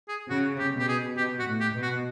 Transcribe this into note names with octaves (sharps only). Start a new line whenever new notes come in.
G#4
C#3 F#4
G4
B2 G4
G#4
B2 G4
F#4
A2
G4
B2
F#4